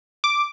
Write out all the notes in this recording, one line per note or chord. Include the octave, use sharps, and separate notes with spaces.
D6